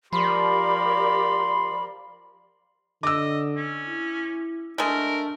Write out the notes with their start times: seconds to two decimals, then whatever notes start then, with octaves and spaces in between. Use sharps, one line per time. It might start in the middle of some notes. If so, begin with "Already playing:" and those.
0.13 F3 G4 A#4 D5 B5 C6
3.03 D3 D#5 D6 E6
3.56 C#4
3.87 E4
4.78 G#3 A3 D4 A#4